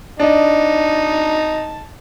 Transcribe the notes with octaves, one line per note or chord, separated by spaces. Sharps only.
D4 D#4 D#5 A5